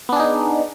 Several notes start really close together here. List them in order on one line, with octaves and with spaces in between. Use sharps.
B3 D4 G#4 D#4